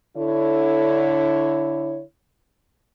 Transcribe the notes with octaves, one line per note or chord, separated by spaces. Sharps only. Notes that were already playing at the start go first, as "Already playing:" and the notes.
D3 E4 C#5